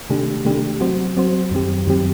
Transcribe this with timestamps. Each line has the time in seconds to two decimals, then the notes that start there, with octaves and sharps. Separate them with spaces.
0.10 C3 D#3 A3 D4 G4
0.45 C3 D#3 A3 D4 G4
0.81 F#3 C4 F#4 C5
1.17 F#3 C4 F#4 C5
1.51 F#2 D#3 F#3 C4 G4
1.87 F#2 D#3 F#3 C4 G4